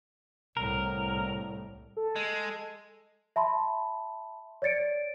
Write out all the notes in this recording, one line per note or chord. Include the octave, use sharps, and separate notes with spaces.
C2 A2 A#4
A4
G#3
E5 A5 B5 C6
C#5 D5 A6 C#7 D7